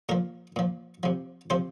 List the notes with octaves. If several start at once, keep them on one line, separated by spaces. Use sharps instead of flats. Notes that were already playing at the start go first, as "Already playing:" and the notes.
A#2 F3 A#4
A#2 F3
C3 F3
C3 F3 C5